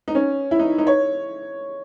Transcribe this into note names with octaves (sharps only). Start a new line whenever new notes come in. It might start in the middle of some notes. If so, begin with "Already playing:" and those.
D#4
C#4
E4
D#4
D#4
C#5